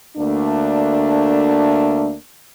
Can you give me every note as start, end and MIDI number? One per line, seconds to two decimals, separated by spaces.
0.17 2.14 38
0.17 2.14 57
0.17 2.14 58
0.17 2.14 62